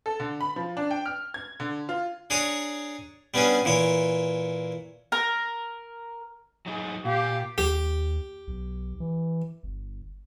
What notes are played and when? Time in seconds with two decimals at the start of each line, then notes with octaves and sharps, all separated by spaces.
0.06 A4
0.20 D3
0.41 B5
0.56 F3
0.77 D4
0.91 G5
1.06 F6
1.34 G#6
1.60 D3
1.89 F4
2.30 D4 G#4 C#5 A#5 C#6
3.34 G3 B3 C#4 D4 G#4
3.65 A#2 E3 C#5
5.12 A#4
6.66 F#3 D#4 G#4
7.05 A#2 G4 F5
7.58 D#2 G4
8.47 B1
9.00 E3
9.63 G1